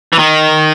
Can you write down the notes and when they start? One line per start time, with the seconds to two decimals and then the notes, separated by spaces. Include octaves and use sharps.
0.13 E3
0.19 D#3